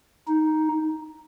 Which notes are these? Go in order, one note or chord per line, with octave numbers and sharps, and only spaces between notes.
D#4